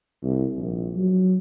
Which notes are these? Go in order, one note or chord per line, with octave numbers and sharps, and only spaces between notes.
C2
A#1
F#3